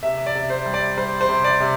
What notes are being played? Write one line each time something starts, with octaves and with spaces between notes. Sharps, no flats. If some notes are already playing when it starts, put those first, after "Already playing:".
C3 E5
D5
C3
C5
G3
D5
G3 C5
C5
C3
D5
C3